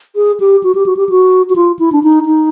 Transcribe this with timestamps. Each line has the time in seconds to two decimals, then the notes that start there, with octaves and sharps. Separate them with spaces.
0.16 G#4
0.40 G4
0.63 F#4
0.75 G4
0.86 F#4
0.97 G4
1.09 F#4
1.49 F#4
1.56 F4
1.79 E4
1.92 D4
2.03 D#4
2.26 D#4